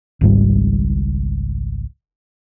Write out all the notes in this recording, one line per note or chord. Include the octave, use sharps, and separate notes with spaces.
G#1 C#2 G#2 G3